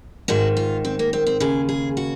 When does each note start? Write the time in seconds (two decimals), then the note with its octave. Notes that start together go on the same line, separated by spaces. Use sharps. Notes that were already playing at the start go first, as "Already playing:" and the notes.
0.28 G#2 D#3 F#4
0.57 F4
0.85 C4
0.99 A#3
1.13 C4
1.27 C4
1.40 D#2 C#3 G#4
1.69 G#4
1.97 F#4